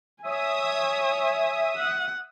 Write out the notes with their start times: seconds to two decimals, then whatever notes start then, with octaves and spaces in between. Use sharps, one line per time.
0.23 C#5 E5 G#5 D#6
1.76 F#5